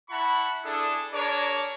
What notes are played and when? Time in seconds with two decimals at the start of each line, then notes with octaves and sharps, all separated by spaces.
0.10 E4 F#5 A5 B5 C#6
0.64 D4 E4 G#4 A4
1.13 D4 G#4 A#4 C#5 D5